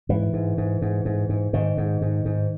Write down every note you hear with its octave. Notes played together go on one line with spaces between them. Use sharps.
G#2 E3
G#2
G#2
G#2
G#2
G#2
G#2 D#3
G#2
G#2
G#2